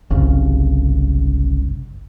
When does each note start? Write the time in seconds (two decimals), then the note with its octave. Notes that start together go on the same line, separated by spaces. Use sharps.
0.10 G1 C2 F#2 C#3